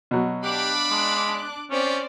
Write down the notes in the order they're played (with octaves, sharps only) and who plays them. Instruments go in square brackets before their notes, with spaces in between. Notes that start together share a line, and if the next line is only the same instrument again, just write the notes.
[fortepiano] B2 F#3
[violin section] D4 D6 F#6 [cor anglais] G4 [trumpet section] F5 B5
[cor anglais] G#3
[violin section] C4 C5 D5 [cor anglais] C#4 [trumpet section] F4 G4